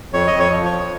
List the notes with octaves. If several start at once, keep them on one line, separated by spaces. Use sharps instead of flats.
F2 C#5
F2 D#5
C#5
F3
C#5
F2